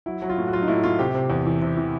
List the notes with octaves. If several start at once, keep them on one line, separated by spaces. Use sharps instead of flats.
F#3 E4
F#3
F4
A2
F#4
F#3 F4
D#4
A2 E4
A2 F4
C3 G4
C3
E2
E3
C3
E3